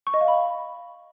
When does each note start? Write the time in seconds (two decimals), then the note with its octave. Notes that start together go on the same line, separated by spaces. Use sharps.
0.07 C#6
0.14 D#5
0.21 F5
0.28 B5